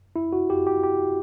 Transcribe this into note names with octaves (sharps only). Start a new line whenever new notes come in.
E4
F#4
G4
G4
G4